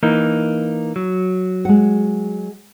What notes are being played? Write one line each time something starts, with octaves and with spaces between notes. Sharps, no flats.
E3 A#3 D#4
F#3
G#3 F#5